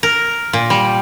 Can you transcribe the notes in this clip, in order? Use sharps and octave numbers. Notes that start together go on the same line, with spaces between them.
A#4
A#2
G3